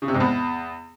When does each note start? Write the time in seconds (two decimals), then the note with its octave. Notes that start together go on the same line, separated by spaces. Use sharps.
0.02 C#3
0.08 C3
0.14 G#2
0.20 E2